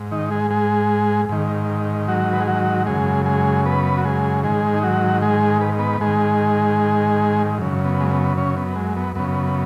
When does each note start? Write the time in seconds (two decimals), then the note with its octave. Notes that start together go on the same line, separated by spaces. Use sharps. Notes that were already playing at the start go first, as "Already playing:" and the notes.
Already playing: G#2
0.11 D#3 D#4
0.31 G#3 G#4
0.51 G#3 G#4
1.29 G#2 D#3
2.08 F#3 F#4
2.33 B4
2.40 G#4
2.47 F#3 F#4
2.86 F#2 C#3 G#3 G#4
3.26 G#3 G#4
3.66 B3 B4
3.97 F#4
4.04 G#3 G#4
4.43 G#2 D#3 G#3 G#4
4.74 D#4
4.83 F#3 F#4
5.22 G#3 G#4
5.61 B4
5.79 B3 B4
6.01 G#2 D#3 G#3 G#4
7.58 F#2 C#3
7.85 B3
8.00 G#3
8.11 B3
8.37 C#3 C#4
8.57 B3
8.76 G#3
8.96 B3
9.15 F#2 C#3 B3